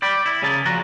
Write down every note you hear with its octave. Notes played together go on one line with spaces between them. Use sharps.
D5 G5 B5
E4
C#3 C#4 G#4 A#4 A5
F2 A#2 F3 F#4 F#5 A#5